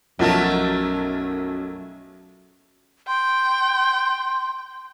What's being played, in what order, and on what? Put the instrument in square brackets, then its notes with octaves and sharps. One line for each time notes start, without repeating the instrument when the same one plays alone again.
[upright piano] B1 F3 A5 [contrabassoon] F#2 [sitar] F#3 A3 A#4
[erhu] G5 [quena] C6